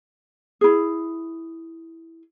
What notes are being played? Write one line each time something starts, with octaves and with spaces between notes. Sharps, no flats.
E4 G#4